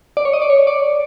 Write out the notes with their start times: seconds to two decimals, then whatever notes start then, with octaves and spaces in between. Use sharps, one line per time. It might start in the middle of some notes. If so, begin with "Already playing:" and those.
0.17 D5
0.25 C#5
0.33 D#5
0.42 D5
0.50 C#5
0.67 D5